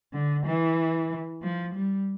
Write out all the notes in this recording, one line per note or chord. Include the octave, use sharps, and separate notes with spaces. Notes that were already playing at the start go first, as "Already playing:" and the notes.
D3
E3
F3
G3